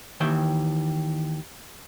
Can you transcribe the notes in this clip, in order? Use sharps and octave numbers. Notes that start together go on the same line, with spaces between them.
D#2 D#3 E3 E5 G5